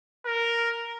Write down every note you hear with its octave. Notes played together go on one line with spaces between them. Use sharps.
A#4